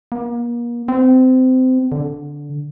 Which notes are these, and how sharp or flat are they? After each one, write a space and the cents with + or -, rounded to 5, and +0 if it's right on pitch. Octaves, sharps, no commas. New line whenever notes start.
A#3 +35
C4 -25
D3 -10